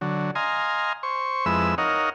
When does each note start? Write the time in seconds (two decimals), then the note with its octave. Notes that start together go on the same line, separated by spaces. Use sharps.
0.01 D3 F#3
0.35 D#5 F5 G#5 A#5 C6
1.03 C5 C#6
1.46 F2 G#3 E4 B4 E6
1.78 D#4 A#4 C#5 D#5 F5 F#5